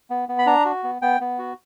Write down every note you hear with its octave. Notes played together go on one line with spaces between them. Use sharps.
B3
B3
B5
D4 A#5
F#4
B3
B3 G5
B3
F#4